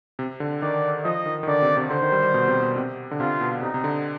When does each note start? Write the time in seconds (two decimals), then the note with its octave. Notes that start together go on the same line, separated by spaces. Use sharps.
0.19 C3
0.40 D3
0.62 D#3 D5
1.05 F3 D#5
1.26 D#3
1.43 D#3
1.47 D3 D5
1.62 C3
1.77 C3
1.91 D3 C5
2.02 D#3
2.12 G3
2.23 G3
2.34 B2
2.48 C3
2.62 B2
2.76 C3
3.11 D3
3.19 C3 F4
3.41 B2
3.62 C3 D#4
3.74 C3
3.84 D3